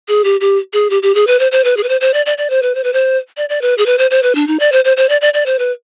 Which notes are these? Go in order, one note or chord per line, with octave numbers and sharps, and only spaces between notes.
G#4
G4
G4
G#4
G4
G4
G#4
B4
C5
C5
B4
G#4
B4
C5
C5
D5
D5
D5
C5
B4
C5
B4
C5
D5
D5
B4
G#4
B4
C5
C5
B4
D4
D#4
D5
C5
C5
C5
D5
D5
D5
C5
B4